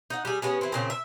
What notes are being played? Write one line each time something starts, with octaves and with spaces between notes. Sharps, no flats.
D#4 F#5
G3 G#4
G#3 B3 C#4 G#4
E3 C4
A#2 C#3 C4
E5